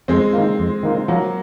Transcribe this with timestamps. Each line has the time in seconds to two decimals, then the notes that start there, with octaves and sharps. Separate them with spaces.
0.08 F2 G#3 C4
0.33 D#3 A#3 F4
0.59 F2
0.83 D#3 A#3 F4
1.08 F3 F#3 A#3